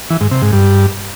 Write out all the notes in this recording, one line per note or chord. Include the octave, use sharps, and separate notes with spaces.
E3
G#2
C3
G#2
G2